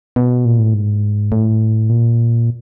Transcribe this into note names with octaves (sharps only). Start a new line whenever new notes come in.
B2
A#2
A2
G#2
A2
A#2